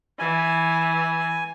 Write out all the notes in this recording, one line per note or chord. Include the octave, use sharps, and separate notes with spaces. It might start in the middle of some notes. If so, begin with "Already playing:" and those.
E3 G#5